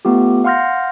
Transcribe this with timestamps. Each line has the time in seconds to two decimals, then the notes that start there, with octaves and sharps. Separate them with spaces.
0.05 A3 B3 F4 G4
0.44 F5 F#5 C6 F6 G6 A#6